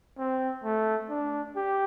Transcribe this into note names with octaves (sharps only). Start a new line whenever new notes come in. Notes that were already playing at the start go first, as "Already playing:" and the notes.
C4
A3
D4
G4